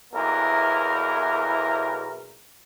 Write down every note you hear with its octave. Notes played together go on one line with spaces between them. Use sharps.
B1 E2 A#3 E4 A#4